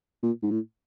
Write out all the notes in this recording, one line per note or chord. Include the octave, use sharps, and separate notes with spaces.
A#2
G#2
A2